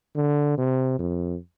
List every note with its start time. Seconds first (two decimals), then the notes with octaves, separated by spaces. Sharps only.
0.16 D3
0.57 C3
0.99 F2